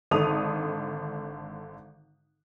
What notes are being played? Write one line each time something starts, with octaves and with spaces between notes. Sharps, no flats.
G#1 D3 A4 D#6 F7